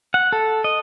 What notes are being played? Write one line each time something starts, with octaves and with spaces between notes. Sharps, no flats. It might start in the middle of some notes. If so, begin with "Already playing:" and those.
F#5
A4
D#5